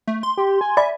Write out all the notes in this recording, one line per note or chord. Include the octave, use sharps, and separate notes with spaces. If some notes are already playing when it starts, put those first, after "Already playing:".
A3
C6
G4
G#5
D5 E5 B5